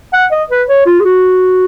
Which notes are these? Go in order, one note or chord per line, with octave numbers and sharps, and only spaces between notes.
F#5
D#5
B4
C#5
F4
G#4
F#4